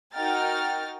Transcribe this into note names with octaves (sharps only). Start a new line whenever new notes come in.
D#4 F#4 A#4 G5 F6 A6